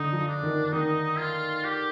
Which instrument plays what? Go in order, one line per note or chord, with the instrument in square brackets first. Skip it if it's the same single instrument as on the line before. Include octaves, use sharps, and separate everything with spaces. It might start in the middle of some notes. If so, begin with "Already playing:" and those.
Already playing: [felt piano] D3 [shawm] D#4
[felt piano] F3
[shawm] D4
[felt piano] D#3
[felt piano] D#3 [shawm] D#4
[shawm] F4
G4